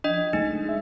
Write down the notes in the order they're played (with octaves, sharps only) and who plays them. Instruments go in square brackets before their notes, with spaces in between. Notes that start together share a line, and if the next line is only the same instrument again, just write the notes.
[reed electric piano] F3 [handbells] D4 D#5
[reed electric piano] C#2 G#3 A3 [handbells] D#4
[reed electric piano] G#3 E5